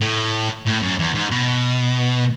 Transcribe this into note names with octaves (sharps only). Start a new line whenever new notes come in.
A2
A2
F#2
E2
G#2
B2